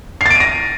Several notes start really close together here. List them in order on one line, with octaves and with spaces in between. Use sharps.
C7 A6 D7 D#7 A#6